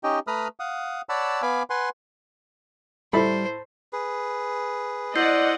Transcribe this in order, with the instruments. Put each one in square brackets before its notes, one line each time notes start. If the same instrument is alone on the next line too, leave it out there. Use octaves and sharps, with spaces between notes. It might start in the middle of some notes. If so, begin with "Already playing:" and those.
[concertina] C#4 D#4 G4 D#5 G5
A3 B4 A#5 B5 D#6 F6
F5 F#5 D#6
C#5 D5 F#5 A5 B5 E6
B3 F5 G#5 B5 D6
B4 F#5 G#5 C6
[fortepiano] A2 E5 B5 [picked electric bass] G3 [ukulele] A4 [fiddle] C5
[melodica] G#4 B4
[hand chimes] E4 G6 C7 [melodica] C5 E6 [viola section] D5 D#5 F#5